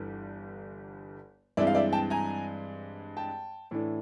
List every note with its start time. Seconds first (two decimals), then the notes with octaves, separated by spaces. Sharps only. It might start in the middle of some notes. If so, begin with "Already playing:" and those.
Already playing: G1 G2 E3 G3
1.57 G2 E3 G#3 C4 D5 E5
1.67 F5
1.75 D5 E5
1.92 G5 A5
2.10 G#5 A#5
3.17 G5 A5
3.71 A2 E3 A3 D4